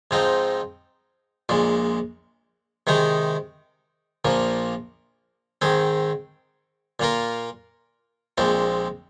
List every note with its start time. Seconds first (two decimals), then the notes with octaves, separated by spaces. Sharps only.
0.11 G#2 F3 C4 D#4
1.49 A#1 A#2 G#3
2.87 C3 D#3 G#3 D#4
4.25 A#1 A#2 F3 A#3
5.62 G#2 D#3 C4 G#4
7.00 A#2 A#3 F4 A#4
8.38 A#1 A#2 G#3 C4